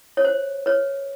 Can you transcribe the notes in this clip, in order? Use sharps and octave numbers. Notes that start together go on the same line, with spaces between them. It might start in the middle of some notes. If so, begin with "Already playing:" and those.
C#5
C5
B4 C#5